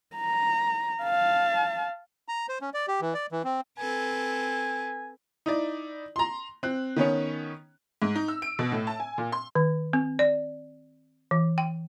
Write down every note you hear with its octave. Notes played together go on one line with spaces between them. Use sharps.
A#5
F5 A5
A#5
C5
C#4
D5
G4
E3
D5
E3
C4
C4 A4 B4 G#5
D#4 E4 D5
A#5 C6
C4 F#6
D#3 B3 C#4 C#5
G#2
D#4
E6
D7
B2
A2
A5
G#5
A#2
C6
D#3
C4
D5
E3
G5